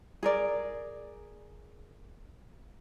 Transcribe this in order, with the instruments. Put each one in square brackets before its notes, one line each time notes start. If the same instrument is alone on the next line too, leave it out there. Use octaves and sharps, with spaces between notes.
[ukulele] G#4 A#4 D5